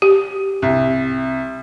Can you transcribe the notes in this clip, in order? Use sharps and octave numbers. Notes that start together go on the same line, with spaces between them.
G4
C2